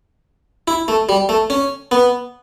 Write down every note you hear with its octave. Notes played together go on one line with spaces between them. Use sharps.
E4
A3
G3
A3
C#4
B3